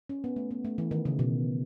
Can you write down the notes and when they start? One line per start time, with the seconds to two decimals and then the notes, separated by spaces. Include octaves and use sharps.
0.09 C#4
0.24 B3
0.36 A3
0.51 B3
0.65 A3
0.78 E3
0.91 D#3
1.05 C#3
1.19 B2